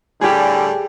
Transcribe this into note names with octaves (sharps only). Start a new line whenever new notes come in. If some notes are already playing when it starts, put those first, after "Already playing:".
A2 D3 G3 G4 G#4